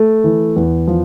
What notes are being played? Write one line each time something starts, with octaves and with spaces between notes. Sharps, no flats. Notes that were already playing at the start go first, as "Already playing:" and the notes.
Already playing: A3
E3
E2
F3